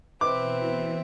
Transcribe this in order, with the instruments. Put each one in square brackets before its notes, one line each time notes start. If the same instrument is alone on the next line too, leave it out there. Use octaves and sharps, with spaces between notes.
[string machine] B2 E3 [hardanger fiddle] C4 E5 [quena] B4 [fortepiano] D6